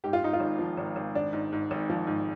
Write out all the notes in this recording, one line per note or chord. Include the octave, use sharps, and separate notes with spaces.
G#2 G4
F4
G#2 D#4
F4
G#1
F3
G#1
G#1
G#1 D4
G#2
G#2
G#1
F3
G#2